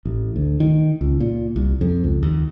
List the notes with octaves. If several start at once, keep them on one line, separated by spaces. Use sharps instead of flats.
A1
D2
D#3
C#2
A#2
C2
F2
C#2
D#2